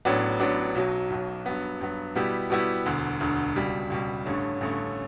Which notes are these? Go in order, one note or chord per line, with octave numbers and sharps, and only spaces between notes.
A1 A2 F#3 B3 D4
A1 A2 F#3 B3 D4
B1 B2 F#3
B1 B2 F#3
G2 F#3 B3
G2 F#3 B3
B2 G3 B3 E4 G4
B2 G3 B3 E4 G4
E1 D2 D3
E1 D2 D3
C#2 B2 G3
C#2 B2 G3
A1 G2 D3 A3 C#4
A1 G2 D3 A3 C#4